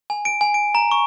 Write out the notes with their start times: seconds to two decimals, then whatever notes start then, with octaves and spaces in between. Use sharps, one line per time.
0.10 G#5
0.25 D7
0.41 G#5
0.54 D7
0.75 A#5
0.91 C#6